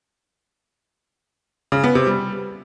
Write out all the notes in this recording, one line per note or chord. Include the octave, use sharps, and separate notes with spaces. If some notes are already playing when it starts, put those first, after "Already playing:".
C#3
B3
C3
G3